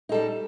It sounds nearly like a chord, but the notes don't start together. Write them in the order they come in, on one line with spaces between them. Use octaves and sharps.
D#4 A4 G3